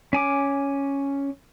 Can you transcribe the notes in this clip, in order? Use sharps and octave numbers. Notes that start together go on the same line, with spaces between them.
C#4 G#5 D6